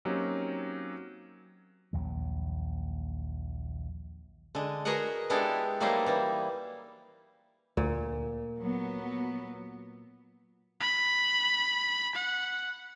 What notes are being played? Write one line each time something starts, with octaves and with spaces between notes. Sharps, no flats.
F#3 A#3 C4 C#4 D#4 G4
A#1 D#2 F#3
D3 G#3
F#4 G#4 A#4 B4 D#5 F#5
G#3 B3 D4 E4 G4 A4
F#3 G3 A#3 D#4 E4 C5
E3 G3
D2 A#2
F#3 B3
B5
F#5